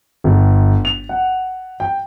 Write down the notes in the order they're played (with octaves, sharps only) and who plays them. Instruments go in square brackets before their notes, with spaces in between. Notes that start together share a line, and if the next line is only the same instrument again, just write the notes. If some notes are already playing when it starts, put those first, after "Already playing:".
[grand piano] G1
F7
F#5
G5